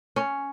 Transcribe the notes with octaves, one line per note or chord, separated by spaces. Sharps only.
C#4